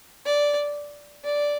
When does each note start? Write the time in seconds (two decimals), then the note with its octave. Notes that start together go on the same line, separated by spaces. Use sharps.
0.26 D5
1.25 D5